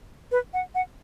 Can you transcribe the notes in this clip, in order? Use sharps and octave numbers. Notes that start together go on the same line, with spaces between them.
B4
F#5
F#5